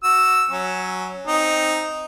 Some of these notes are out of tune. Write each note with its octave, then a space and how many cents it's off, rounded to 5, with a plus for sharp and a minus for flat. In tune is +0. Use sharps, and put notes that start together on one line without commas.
F#4 +0 E6 +0
F#3 +0 C#4 +0
C4 +0 D#4 +0